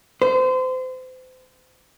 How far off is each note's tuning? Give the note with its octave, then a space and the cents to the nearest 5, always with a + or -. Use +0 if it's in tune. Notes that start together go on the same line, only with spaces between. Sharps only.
C5 -30